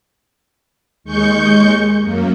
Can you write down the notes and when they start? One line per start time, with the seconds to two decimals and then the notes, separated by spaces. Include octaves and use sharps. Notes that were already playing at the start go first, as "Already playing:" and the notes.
1.04 D#2 G#3 C#6 G6 C#7
2.02 F#2 A#3